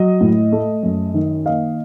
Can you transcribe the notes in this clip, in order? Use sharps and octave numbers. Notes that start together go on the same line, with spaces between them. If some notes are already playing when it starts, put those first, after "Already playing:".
Already playing: F#3 D#5
A2
A3
F#2
D#3
A#3 D#5 F5